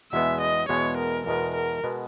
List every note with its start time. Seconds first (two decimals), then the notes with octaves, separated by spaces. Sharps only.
0.12 E2 B2 G#3 B3 E5
0.42 D#5
0.69 E2 B2 G#3 B3 C#5
0.98 A#4
1.26 E2 B2 G#3 B3 A#4
1.55 A#4
1.84 B2 G#3 B3